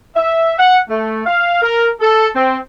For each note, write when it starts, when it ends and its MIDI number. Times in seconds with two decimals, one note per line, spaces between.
0.16 0.54 76
0.59 0.78 78
0.89 1.22 57
1.26 1.59 77
1.62 1.90 70
2.00 2.27 69
2.35 2.57 60